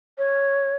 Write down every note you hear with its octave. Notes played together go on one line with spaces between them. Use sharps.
C#5